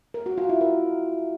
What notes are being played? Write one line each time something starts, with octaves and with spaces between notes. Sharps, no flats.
A#4
F#4
F4
E4
A#4